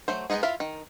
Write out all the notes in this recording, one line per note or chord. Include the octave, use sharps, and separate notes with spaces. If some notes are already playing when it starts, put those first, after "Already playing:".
F#3 A3 C5
G#3 A#3 B3 D#4 G#4
E4 F4 E5 F5
D#3